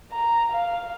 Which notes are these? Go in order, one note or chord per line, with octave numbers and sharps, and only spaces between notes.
A#5
F5